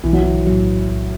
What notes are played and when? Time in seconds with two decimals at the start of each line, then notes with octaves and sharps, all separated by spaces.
0.04 B1 E3
0.13 F#3
0.22 E3
0.47 A2 F#3